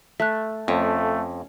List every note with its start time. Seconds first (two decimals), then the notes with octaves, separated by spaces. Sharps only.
0.20 A3 E5 F#6
0.68 F2 A3 C#4